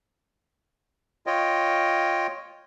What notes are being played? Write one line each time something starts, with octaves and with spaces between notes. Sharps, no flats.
F4 C#5 D#5 G5